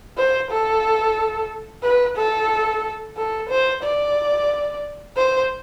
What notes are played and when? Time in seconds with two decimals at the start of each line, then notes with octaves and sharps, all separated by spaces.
0.17 C5
0.51 A4
1.83 B4
2.17 A4
3.17 A4
3.49 C5
3.83 D5
5.17 C5